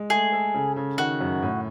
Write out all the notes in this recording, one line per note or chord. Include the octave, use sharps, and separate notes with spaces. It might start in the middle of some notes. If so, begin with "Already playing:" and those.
Already playing: G#3
A3 G#4
A4
C#3
C#3
D#3 F#4
F#2
A2